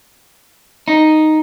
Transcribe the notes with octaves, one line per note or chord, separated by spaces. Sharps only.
D#4